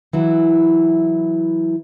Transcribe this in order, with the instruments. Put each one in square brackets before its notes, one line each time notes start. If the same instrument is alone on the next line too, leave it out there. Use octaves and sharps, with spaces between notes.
[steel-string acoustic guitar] E3 F#3 E4